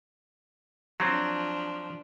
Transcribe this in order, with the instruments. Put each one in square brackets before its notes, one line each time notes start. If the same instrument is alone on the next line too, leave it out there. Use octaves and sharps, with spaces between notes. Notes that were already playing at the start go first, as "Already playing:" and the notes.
[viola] F3 D4 [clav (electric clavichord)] F#3 C4